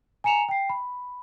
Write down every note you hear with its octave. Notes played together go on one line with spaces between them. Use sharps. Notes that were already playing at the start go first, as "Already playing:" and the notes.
G#5 A#5 C#7 E7 F7
G5 C7
B5